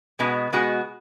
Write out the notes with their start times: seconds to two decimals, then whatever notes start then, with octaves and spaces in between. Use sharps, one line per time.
0.19 B2 G#3 B3 F#4
0.53 B2 G#3 B3 F#4